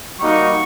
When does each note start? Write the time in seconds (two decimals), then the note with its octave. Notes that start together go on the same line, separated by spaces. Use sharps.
0.20 G3 A#3 D#4 F#4 C#6